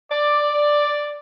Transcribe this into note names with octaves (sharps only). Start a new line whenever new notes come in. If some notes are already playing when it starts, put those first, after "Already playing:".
D5